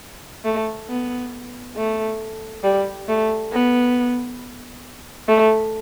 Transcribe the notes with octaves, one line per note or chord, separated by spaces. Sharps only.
A3
B3
A3
G3
A3
B3
A3